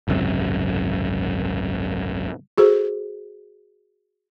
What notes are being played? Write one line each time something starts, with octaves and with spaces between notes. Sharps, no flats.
G#1 C#2 F#2 C3
F#4 G#4 A4 C5